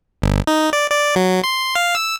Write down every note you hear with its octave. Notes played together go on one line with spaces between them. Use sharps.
G1
D#4
D5
D5
F#3
C6
F5
E6